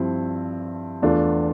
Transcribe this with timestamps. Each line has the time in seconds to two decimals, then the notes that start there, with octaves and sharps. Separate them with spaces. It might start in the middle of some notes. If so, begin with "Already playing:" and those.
Already playing: G2 F3 C4 E4
1.02 E2 E3 A3 D4 F4